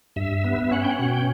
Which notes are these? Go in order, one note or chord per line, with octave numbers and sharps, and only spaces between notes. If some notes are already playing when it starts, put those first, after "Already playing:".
G2 E5
B3
E5
C#4 F#5
G5
F#5
B2
G5